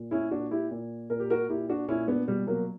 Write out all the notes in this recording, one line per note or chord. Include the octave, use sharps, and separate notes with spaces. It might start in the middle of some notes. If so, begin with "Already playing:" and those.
Already playing: A#2
C#4 E4
A#2 D4 F#4
E4 G4
A#2
A#2 A#4
G4
F#4 A#4
A#2 E4 G4
D4 F#4
A#2 C#4 E4
B3 D4
B2 G3
F#3 A#3